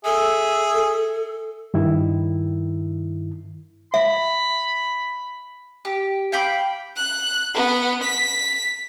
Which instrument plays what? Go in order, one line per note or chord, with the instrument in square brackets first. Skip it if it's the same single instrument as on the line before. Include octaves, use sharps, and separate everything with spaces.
[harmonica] G#4 E5 [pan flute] A4
[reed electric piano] G2 D#3 E4
[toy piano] E5 [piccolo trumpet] B5
[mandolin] G4
F5 G5 B5 D6
[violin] F#6
B3
B6